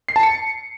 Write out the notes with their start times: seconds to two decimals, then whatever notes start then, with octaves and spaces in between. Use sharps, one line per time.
0.09 C7
0.16 A5
0.23 C#7